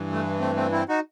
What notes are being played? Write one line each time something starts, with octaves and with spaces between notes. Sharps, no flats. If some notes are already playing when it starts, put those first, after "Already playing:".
Already playing: G2 E3
A3
A3 C4
A3 C4
C4 E4
D#4 F#4